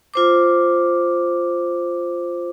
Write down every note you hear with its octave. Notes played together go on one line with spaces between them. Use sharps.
F4 C5 D6